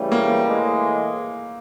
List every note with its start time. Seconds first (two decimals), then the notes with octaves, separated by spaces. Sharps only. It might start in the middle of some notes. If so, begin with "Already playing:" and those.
Already playing: C#3 E3 G3 A3
0.12 A#3
0.44 A2 E3 G#3